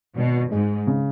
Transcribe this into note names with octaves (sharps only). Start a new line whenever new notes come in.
G#1 B2
G#2 G#3
C#3